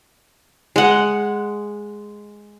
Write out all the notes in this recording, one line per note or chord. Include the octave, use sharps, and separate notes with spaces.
G#3 F#5